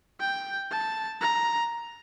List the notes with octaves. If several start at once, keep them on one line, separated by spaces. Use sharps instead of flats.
G5
A5
A#5